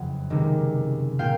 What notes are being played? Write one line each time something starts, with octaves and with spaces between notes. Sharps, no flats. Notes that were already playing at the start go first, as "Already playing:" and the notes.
Already playing: F#1 F2 C#3 E3 F#5
C#2 C3 D#3
A#2 F5 G5